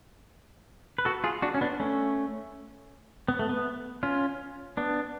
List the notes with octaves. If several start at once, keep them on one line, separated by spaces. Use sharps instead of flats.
B4
F#4 A4
F4 G#4
D4 F#4
C#4
B3 D4
A3 C#4
B3
A3
B3
C#4 F4
B3 D4